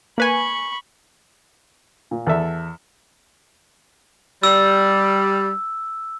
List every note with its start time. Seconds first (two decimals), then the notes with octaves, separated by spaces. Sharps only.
0.18 A#3 B4 G#5 B5 C#6
2.11 A#2
2.27 E2 A4 E5
4.43 G3 E6